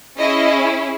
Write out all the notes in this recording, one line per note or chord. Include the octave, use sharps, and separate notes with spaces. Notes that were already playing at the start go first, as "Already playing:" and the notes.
C#4 E4 G#4 D#5